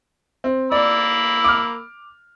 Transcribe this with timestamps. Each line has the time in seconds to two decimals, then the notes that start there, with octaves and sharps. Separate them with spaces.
0.44 C4
0.72 A#3 D5 B5 E6
1.44 D6 F6